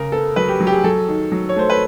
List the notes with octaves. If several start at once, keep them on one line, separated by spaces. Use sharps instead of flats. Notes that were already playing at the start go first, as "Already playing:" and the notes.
Already playing: C#3 A#4
B3 A4
F#3 B4
G4
F#3
G4
G#4
F#3 A4
D#3
F#3
C#5
A3 C5
B4